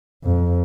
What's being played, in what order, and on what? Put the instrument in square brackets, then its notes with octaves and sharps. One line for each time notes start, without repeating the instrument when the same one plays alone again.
[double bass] F2